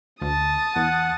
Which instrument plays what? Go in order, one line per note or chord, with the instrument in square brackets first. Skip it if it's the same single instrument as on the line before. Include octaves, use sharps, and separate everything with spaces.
[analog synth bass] D2 [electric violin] A5 D#6
[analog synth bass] E2 [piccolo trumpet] F#5